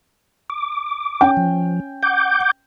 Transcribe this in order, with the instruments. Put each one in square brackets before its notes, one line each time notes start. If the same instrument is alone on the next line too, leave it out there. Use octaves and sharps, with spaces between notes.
[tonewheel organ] D6
[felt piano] C#4 G5
[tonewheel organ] F3
F#5 D6 G6